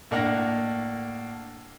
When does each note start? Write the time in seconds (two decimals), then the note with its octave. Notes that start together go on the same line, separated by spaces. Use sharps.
0.11 A2 A#3 D4 F#5 F6 A#6